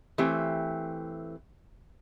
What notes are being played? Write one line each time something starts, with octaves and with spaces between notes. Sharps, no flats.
E3 A3 C4 G4